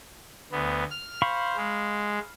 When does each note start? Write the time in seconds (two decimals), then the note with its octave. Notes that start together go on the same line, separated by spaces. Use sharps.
0.52 D2 B3
0.90 F6
1.22 C5 F5 B5 C#6
1.57 G#3